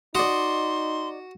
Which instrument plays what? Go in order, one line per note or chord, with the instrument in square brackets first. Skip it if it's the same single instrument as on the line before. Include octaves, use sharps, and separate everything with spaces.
[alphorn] D#4 [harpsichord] F#4 [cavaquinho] D5 D#5 [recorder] C6